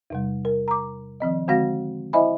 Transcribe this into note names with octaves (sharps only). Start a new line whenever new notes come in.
E2 C3 G3
A#4
A#5 D6
D#3 F3 C4 D#5
D3 G#3 C4 F#4 F5 A#6
E4 C5 D#5 E5 G#5 B5